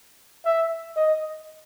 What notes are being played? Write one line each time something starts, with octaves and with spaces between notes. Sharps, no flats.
E5
D#5